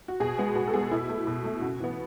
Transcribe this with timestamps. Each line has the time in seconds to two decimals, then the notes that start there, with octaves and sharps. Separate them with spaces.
0.08 F#4
0.20 B2 G#4
0.38 G#3 B3
0.55 B2 F#4
0.68 A4
0.73 G#3 B3 G#4
0.91 B2 E4
1.09 A3
1.27 B2
1.44 A3
1.62 C#3 F#4
1.80 E3 B3